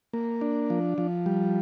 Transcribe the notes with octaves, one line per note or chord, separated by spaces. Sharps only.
A#3
D4
F3
F3
G3